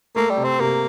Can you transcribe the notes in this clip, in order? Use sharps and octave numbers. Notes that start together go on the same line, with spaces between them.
A3 A#3
G3
C3
C4
C3 A#3